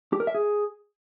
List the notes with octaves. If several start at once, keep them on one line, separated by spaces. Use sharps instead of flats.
G4
A#4
E5
G#4